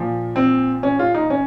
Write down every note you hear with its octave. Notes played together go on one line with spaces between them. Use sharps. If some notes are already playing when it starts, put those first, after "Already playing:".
Already playing: A#2 F3
C4
C#4
F4
D#4
C#4